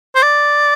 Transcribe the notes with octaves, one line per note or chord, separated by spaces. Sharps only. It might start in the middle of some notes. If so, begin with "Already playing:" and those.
C5
D5